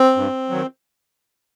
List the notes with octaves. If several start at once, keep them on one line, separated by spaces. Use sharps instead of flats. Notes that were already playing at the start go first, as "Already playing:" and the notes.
Already playing: C4
G2
D#3 F#3